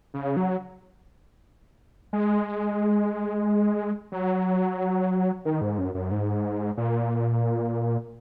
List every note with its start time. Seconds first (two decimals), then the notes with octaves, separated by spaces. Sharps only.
0.14 C#3
0.37 F#3
2.13 G#3
4.12 F#3
5.45 D#3
5.61 G#2
5.78 F#2
5.95 F#2
6.11 G#2
6.77 A#2